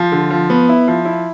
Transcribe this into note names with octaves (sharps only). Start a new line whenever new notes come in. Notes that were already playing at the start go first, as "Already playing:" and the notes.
Already playing: F3
D3
F3
B3
E4
F3
E4